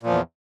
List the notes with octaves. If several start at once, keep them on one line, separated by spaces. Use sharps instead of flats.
E2 A#2 F3